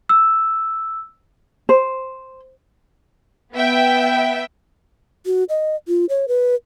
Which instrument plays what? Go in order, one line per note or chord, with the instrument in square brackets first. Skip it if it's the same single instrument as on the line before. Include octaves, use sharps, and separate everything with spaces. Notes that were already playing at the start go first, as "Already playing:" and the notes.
[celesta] E6
[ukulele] C5
[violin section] B3 E5 G5
[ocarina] F#4
D#5
F4
C#5
B4